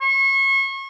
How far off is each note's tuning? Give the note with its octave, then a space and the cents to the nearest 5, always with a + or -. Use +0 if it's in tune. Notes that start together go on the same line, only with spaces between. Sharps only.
C#6 -35